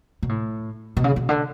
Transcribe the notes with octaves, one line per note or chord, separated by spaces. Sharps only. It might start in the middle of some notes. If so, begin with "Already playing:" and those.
B2
A2
B2
C#3
B2
D3